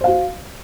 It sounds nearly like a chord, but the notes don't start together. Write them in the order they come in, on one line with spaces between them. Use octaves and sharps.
C5 F5 F#4